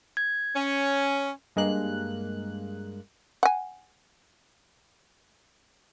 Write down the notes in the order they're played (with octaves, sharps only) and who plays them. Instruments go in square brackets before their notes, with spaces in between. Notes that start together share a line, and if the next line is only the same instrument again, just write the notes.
[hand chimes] G#6
[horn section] C#4
[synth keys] G2 G#3 A#3 F#6
[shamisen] F#5 G#5